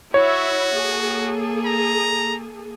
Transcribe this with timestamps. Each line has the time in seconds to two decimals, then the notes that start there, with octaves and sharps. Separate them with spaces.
0.14 E4 F#4 C#5 E5
0.73 A#3 G#4 A4
1.65 A#5